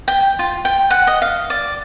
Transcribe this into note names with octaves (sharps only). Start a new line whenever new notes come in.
G5
F4
G5
F#5
D#5
F5
D5